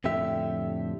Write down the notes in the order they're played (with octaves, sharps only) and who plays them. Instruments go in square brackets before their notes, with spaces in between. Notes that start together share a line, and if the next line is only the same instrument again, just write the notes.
[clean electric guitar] F2 A2 D3 G4 E5